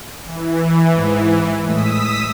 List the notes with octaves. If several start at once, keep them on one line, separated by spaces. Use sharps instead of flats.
E3
G#2 G#3
A2 G#3 D#6 E6 B6